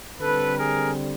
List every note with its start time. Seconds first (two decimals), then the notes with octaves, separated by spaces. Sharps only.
0.20 D3 G3 C4 A4 B4
0.58 G#4 A#4